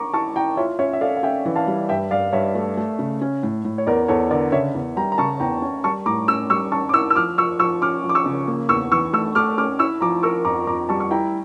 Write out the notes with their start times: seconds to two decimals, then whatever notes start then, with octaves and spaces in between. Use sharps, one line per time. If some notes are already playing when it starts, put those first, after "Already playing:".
Already playing: A#5 C#6 D6
0.13 E4 A5 C#6
0.36 E4 G5 A#5
0.57 F4 C#5 E5
0.79 C#4 C#5 E5
0.93 E5
1.01 A4 D5 F5
1.17 F5
1.23 C#4 E5 G5
1.45 E3
1.56 F5 A5
1.67 G3
1.89 G2 E5 G5
2.11 G2 D5 F5
2.33 G2 C#5 E5
2.55 A3
2.77 A3
2.99 C#3
3.21 C#4
3.43 A2
3.65 A2
3.78 C#5
3.87 E2 A#4 D5
4.08 E2 A4 C#5
4.31 D3 A#4 D5
4.52 C#3 C#5 E5
4.74 E2
4.97 G3 G5 A#5
5.12 A#5
5.18 C#3 A5 C#6
5.40 E2 G5 A#5
5.62 C#4
5.84 G3 A5 C#6
6.06 A2 A#5 D6
6.28 C#4 C#6 E6
6.50 G3 C#6 E6
6.72 C#4 A5 C#6
6.89 D6
6.93 E4 C#6 E6
7.10 E6
7.15 F3 D6 F6
7.38 F3 C#6 E6
7.59 F3 C#6 E6
7.82 C#4 D6 F6
8.04 F3
8.09 D6
8.15 C#6 E6
8.26 C#3
8.47 A#3
8.69 E2 C#6 E6
8.92 E3 C#6 E6
9.13 A3 C#6 E6
9.35 A3 D6 F6
9.58 C#4 D6 F6
9.79 E4 C#6 E6
10.01 F3 A#5 D6
10.23 A#4 C#6 E6
10.45 F2 A#5 D6
10.67 F2 A#5 D6
10.89 G3 A5 C#6
11.00 C#6
11.11 E4 G5 A#5